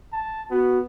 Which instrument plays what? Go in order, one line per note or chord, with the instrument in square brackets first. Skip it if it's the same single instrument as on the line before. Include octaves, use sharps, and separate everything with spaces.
[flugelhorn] A5
[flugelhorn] B3 [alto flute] F#4